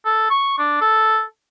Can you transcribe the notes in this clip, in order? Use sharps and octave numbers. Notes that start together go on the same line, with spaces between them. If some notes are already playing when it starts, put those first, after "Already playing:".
A4
C#6
D4
A4